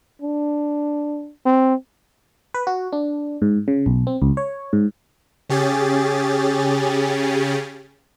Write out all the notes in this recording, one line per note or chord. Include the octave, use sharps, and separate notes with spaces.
D4
C4
B4
F#4
D4
G#2
C#3
B1
C4
C#2
C#5
G#2
C#3 C#4 G4 G#4 A6